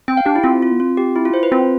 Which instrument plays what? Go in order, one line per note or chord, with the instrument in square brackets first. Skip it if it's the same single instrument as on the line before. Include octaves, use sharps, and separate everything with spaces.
[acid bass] C4 [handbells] G5
[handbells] F5
[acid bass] D4 [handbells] G4
[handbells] E4
[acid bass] C4 [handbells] F4
[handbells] F4
[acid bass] B3
[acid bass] C4 [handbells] F4
[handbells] G4
E4
F4
C5
B4
[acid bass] C4 [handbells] F4